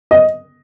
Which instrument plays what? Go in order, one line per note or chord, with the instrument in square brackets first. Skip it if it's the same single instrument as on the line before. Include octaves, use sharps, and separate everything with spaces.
[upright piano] D#5